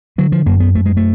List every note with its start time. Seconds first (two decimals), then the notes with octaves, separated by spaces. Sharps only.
0.18 D3 F#3
0.32 F3
0.46 F#2 A#3
0.60 B3
0.75 F#2 A3
0.86 G#3
0.97 A3